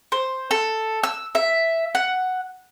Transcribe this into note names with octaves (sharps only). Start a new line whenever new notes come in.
C5
A4
E6
E5
F#5